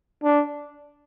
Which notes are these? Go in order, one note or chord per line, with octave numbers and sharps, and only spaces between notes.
D4